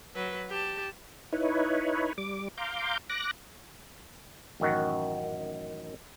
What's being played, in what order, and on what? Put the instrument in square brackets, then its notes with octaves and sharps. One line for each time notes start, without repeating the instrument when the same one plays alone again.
[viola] F#3 B4
G4 A5
[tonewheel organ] D#4 E4 B4 C#5
G3 D6
F5 A#5 C6 D6 G6
D6 F#6 A#6
[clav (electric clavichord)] A1 F#2 D#3 F#4